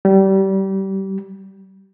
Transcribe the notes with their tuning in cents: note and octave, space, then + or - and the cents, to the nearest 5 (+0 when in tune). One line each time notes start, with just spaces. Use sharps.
G3 -25